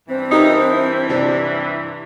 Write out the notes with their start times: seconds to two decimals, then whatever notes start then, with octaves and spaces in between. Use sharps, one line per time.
0.08 G2 E3 C4
0.31 D#4 G4 A#4 E5
0.73 E4
1.09 C3 D4 G4